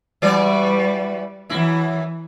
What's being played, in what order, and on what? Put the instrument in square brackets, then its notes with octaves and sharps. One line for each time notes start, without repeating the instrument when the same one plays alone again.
[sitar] E3 F#4 D5 [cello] G3
[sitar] F#2 E4 [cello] E3